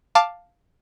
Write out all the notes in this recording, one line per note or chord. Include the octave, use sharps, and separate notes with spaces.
F5 A5 D6